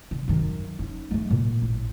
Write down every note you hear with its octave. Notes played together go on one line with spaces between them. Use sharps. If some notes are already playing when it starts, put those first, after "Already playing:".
D3
F#2 D#3
C#4 D#4
G#3 A3
A#2
A1